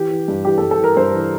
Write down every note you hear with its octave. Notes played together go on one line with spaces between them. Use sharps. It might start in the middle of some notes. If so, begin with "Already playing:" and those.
Already playing: E3 G4
E3
G2
E3 G4
G2 A4
A4
E3 A#4
G2 C5
E3